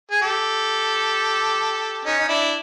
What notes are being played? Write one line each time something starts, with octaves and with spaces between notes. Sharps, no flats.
G#4
G4 A4
C#4 D#4
D#4
D4 E4